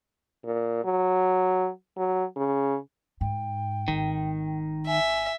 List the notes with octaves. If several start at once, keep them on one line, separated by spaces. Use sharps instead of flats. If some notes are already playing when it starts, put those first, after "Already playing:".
A#2
F#3
F#3
C#3
G#2 G5
G#1 D#3
E5 G#5